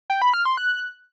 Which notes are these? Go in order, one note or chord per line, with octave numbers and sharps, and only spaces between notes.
G5
B5
F6
C6
F#6